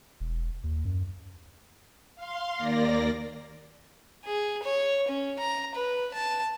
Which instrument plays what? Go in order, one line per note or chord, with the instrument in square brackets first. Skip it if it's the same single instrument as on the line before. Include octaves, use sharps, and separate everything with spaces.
[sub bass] E1
D#2
F#2
[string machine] F5 C6
D#2 A#3 D5 A#6
[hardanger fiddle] G#4
C#5
C#4
A#5
B4
A5